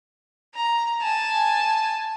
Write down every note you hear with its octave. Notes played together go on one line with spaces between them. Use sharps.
A#5
G#5 A5